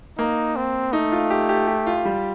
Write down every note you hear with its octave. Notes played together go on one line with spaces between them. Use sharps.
A#3 D#4
C4
A3 D#4
F4
G4
G4
G4
F4
G3